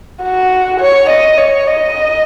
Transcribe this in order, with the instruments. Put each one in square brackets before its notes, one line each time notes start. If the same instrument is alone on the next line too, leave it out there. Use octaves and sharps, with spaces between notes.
[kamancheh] F#4
C#5
D#5
C#5
D#5